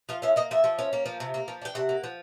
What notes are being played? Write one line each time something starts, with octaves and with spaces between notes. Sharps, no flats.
F3 F5
C#4 E5
A#3 D#5
F3 E5
F3
C#4
A#3
F3
C3
A#3
F3
D4 G5
C3 F#5
A#3
F3